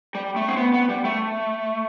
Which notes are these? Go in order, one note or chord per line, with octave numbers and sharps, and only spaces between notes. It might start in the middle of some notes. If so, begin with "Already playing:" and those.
G3
A3
C4
B3
B3
G3
A3